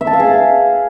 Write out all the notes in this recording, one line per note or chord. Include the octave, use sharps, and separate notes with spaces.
E5
A5
F5
G#4